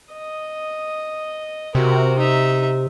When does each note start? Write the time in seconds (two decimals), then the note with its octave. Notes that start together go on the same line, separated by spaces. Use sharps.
0.12 D#5
1.75 C3 F#4 A#4
2.18 D#4 E5